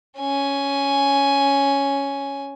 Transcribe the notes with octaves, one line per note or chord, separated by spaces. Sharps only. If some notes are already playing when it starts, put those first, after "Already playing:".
C#4 G#5